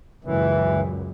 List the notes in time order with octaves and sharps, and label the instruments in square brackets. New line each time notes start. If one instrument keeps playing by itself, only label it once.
[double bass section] C#2 F#2 A#2 [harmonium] E3